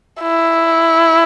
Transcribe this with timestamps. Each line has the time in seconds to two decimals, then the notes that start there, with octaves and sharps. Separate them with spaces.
0.22 E4